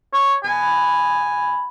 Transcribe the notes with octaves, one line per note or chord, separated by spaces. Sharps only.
C#5
B2 G#5